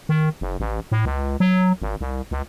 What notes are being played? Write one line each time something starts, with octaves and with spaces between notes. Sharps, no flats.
D#3
F#1
A1
A2
C#2
F#3
G#1
C2
C#2